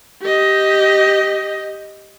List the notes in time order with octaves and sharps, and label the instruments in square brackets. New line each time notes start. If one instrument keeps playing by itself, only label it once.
[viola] G4 D#5